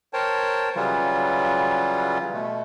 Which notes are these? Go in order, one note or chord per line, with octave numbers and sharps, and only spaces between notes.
A#4 C5 C#5 G5 A5
C#3 E3 F#3 G3 F4
B2 A3